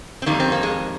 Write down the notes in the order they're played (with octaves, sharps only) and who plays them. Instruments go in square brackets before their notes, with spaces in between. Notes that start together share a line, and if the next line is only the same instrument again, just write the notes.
[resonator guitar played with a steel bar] C4
F2 D#3 G3 A#3
C4
A#3
G#3